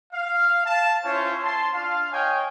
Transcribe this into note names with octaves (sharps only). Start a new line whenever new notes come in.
F5
A5
C#4 E4 F4 C5 C#5
A5 C6
D4 F4 F5
C#5 D#5 G5 G#5